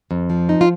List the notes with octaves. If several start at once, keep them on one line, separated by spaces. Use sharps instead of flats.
F2
F3
D#4
F4